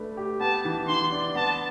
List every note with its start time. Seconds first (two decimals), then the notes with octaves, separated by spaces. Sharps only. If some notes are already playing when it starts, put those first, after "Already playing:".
Already playing: A3 D4 B4
0.17 G4
0.40 B3 A5
0.65 E3
0.88 E3 C6
1.12 D4
1.35 B3 A5